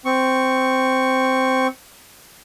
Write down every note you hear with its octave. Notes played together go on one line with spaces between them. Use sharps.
C4 C#6